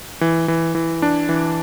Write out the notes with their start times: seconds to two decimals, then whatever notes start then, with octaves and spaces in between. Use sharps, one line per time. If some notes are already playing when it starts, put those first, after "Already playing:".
0.21 E3
0.48 E3
0.75 E3
1.02 D4
1.29 E3